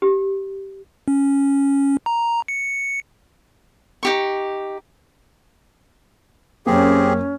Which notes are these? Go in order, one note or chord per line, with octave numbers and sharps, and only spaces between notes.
G4
C#4
A#5
C#7
D#4 G4 C#6
F#2 A#3 C4 C#4 G4 G#4